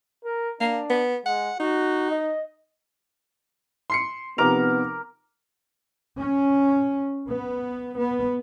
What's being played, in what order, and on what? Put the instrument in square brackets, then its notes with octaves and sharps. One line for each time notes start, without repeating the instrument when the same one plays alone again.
[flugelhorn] A#4
[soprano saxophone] A#3 [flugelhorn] D4
[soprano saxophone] B3
[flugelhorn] G#3 [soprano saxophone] F#5
[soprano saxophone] D#4 [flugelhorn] F#4
[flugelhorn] D#5
[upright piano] C6 C7 C#7
[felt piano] C3 F3 D#4 [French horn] B3 [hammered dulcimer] A#4 D6 [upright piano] F7
[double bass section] C#4
B3
B3